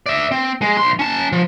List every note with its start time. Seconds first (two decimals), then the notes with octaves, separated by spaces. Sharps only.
0.06 D5 E5
0.31 C4
0.62 G#3
0.77 B1 C6
0.99 C#4 A5
1.32 F3